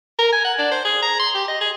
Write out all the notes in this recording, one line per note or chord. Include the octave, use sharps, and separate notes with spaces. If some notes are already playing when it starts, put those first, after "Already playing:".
A#4
G#5
F#5
D4
C5
G#4
A#5
C6
G4
D#5
G#4